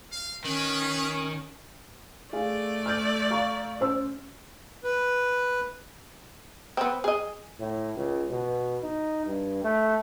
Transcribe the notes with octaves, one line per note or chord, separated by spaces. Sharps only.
F5
D#3 C#4 B4
A3 G#4 D5 F5 G#5
F6 G6 D7
F5 A#5 C#6
C#4 C5 E6
B4
B3 C4
G#4 D#5
A2
C#2
B2
D#4
G2
A3